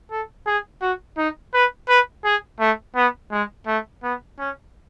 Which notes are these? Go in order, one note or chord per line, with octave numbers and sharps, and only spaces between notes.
A4
G#4
F#4
D#4
B4
B4
G#4
A3
B3
G#3
A3
B3
C#4